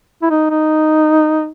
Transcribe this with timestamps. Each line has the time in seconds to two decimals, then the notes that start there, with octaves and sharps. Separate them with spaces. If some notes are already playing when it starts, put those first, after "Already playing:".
0.23 E4
0.30 D#4
0.50 D#4